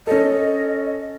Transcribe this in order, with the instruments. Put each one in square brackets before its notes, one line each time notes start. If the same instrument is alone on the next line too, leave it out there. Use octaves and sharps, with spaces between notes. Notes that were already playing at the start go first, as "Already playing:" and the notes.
[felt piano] C#4 A4 [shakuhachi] D#5